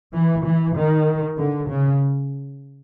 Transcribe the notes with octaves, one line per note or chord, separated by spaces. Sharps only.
E3
E3
D#3
D3
C#3